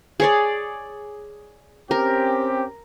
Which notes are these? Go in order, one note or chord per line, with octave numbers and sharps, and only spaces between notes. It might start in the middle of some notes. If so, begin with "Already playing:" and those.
G#4 C#5 D5
C4 C#4 G4 A#4